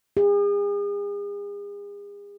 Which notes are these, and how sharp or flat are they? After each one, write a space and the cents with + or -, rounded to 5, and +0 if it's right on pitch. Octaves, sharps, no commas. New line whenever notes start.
G#4 -40